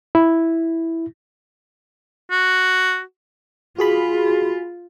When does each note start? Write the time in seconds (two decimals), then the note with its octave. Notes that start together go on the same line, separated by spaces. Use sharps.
0.15 E4
2.31 F#4
3.78 F4 F#4 G#4 B5